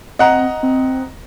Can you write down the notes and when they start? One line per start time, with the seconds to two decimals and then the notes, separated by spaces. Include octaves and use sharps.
0.19 C4 D#5 F#5 A#5
0.63 C4